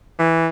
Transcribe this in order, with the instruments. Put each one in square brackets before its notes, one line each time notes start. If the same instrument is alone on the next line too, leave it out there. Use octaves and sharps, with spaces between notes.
[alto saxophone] E3